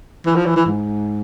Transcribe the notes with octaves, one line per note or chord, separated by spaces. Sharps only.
E3
F3
E3
E3
G#2